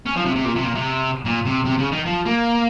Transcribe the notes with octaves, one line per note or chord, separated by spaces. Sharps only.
C#4
F3
C3
C3
A#2
C3
A#2
C3
A#2
C3
C3
C#3
D#3
F3
A#3